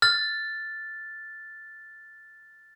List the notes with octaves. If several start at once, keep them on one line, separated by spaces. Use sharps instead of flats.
F6 A6